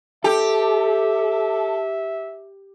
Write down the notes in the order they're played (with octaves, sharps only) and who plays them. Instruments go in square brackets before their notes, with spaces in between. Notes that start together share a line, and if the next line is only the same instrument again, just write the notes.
[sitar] G4 [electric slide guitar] A4 [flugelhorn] E5